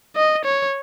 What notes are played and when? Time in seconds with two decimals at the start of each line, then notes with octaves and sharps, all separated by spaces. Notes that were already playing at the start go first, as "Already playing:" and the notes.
0.16 D#5
0.45 C#5